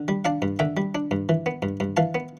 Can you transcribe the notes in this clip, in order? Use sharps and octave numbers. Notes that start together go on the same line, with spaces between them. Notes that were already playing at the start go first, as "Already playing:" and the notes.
Already playing: D3
G3
D4 F5 A5
G2
D3 E5 G5
G3
D4
G2
E3
B3
G2
G2
E3 F5 A5
B3